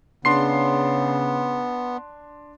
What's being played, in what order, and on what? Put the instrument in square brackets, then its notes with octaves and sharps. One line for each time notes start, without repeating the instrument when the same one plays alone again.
[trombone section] C#3 [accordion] B3 [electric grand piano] D4 C6 C7